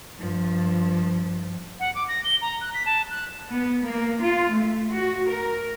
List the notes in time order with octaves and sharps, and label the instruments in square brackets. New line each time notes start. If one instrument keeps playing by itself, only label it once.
[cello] G2 F3
[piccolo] F#5
D6
A#6
G7
A#5
F#6
B6
A5
F#6
[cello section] B3
A#3
F4
A3
F#4
A#4